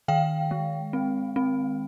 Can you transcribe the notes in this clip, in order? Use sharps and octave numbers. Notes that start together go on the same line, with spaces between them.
D#3 F5 G5
G#3
C4
C4